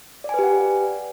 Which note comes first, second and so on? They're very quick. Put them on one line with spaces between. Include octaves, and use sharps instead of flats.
D5 G#5 B4 G4 F#5